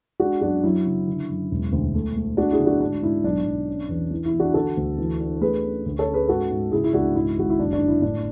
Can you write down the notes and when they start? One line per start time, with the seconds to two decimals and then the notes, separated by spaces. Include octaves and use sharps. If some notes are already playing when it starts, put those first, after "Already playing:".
0.20 G#3 D4 F#4
0.41 F#2 D4 F#4
0.63 F#3 E4
0.86 C#3
1.08 D3
1.29 F#2
1.51 E1
1.72 D2
1.95 A3
2.16 A3
2.37 A3 D4 F#4
2.51 E4 G#4
2.59 D3
2.66 D4 F#4
2.80 G#2 D4
3.02 G#2 E4
3.24 B1 D4
3.45 B1
3.68 C#4
3.89 E2
4.11 E3
4.26 E4
4.34 E3
4.40 D4 F#4
4.54 D3 F#4 A4
4.77 D2
4.98 E3
5.20 D4
5.41 A3 G#4 B4
5.64 C#4
5.86 D2
5.99 A4 C#5
6.07 C#4
6.14 G#4 B4
6.28 G#2 F#4 A4
6.50 G#2
6.72 C#3 E4 G#4
6.84 E4
6.93 C#2 D4 F#4
7.16 G#2 E4
7.38 G#1 F#4
7.49 E4
7.59 F#1 D4
7.73 D4
7.81 D3
7.88 E4
8.02 A2 D4